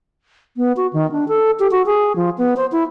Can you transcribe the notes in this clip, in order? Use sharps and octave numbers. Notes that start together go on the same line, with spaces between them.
B3
F#4
D#3
D4
A4
G4
F#4
G#4
F3
B3
C5
E4